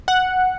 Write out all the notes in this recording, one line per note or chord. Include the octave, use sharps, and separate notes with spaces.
F#5